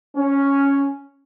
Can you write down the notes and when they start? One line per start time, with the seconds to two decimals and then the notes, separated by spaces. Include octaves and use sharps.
0.17 C#4